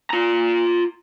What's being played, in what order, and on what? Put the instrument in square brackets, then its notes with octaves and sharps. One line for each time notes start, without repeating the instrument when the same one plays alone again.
[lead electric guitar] F4 A#5